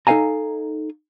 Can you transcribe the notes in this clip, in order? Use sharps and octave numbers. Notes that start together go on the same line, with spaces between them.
D#4 A4 B4 F5 G#5 A#5